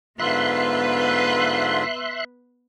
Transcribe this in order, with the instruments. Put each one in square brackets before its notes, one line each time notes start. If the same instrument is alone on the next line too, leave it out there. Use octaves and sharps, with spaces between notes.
[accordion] G#2 D3 F4 [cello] B3 B4 [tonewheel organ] E5 C6 F#6